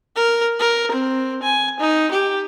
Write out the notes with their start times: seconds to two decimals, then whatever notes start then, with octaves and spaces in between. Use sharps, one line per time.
0.16 A#4
0.60 A#4
0.91 C4
1.43 G#5
1.80 D#4
2.11 G4